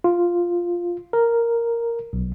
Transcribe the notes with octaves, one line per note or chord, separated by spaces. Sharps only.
F4
A#4
B1